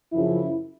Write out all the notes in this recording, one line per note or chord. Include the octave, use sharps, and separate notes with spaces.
F#2 C#3 F3 E4